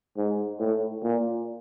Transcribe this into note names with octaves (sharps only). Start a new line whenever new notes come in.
G#2
A2
A#2